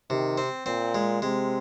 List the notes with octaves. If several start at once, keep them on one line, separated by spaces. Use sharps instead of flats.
C3 D#3
C4
A#2 C4
G#3
C3 G#3